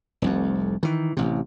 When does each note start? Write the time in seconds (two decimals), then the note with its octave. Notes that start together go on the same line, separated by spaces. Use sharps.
0.22 F1 C2 F2
0.83 D#3 E3
1.17 A1 C3